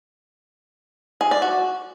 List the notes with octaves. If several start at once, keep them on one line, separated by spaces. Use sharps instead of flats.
G#4
D5
F#4